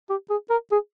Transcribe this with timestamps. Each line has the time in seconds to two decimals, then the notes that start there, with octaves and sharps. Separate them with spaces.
0.09 G4
0.30 G#4
0.50 A#4
0.72 G#4